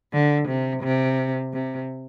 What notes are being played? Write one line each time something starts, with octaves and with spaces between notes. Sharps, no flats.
D3
C3
C3
C3